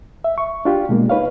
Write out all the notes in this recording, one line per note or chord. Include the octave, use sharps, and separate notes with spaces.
E5
C#6
D4 F4 G4
B2 G#3 A#3
D#4 B4 C#5 F5